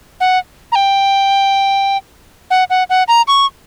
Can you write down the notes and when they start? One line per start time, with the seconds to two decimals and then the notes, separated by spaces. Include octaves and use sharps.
0.20 F#5
0.72 A#5
0.75 G5
2.50 F#5
2.70 F#5
2.90 F#5
3.08 A#5
3.28 C#6